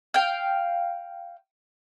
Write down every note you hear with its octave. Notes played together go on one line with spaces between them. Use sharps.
F5 G5